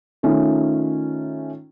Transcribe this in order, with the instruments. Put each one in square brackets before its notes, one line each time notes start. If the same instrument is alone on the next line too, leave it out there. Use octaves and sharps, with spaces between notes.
[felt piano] D#3 A3 C#4 D#4 F4